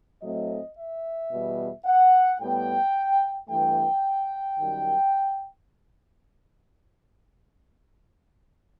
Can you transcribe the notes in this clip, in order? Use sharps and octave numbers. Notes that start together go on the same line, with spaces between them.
A2 F#3 A3 C4 D#5
E5
E2 B2 G3
F#5
A2 G3 B3 G5
G2 E3 A3 G5
F#2 D#3 G3